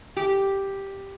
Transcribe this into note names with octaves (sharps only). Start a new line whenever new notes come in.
G4